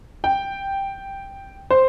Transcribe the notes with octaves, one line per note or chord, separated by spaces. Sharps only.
G5
C5